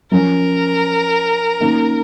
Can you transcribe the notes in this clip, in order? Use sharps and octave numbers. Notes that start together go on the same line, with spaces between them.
F3 C#4 A#4
D#3 A#3 C#4